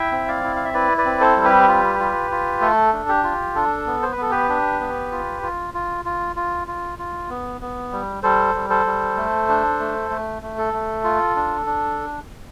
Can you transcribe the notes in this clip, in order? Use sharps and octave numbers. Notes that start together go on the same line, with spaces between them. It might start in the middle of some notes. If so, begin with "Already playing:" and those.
Already playing: E4 E5 G5
C4
D5 F5
E4
F5
E5
E4 B4 D5
B4 D5
C4
A4 C5
G3
G4 B4
F4
F4
F4
A3 A4
D4
G4
F4
D4 A4
B3
C5
B4
B3 A4
G4 B4
D4
B3
F4
F4
F4
F4
F4
F4
F4
B3
B3
G3
G3 A4 C5
G3
A4 C5
G3
A3
D4
A3
A3
A3
A4
A3
F4
D4
D4